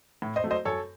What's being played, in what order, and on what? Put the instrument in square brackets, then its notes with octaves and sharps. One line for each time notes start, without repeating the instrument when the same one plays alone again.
[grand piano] A2
C5 D#5
F#3 A3
C5 D#5
F#2 A4 C#5